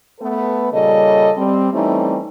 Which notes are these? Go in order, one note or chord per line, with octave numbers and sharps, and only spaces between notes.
A3 B3 A4 B4
A#2 C#3 G3 A4 C#5 D#5
G3 C4
E3 G3 A3 C4 C#4 D#4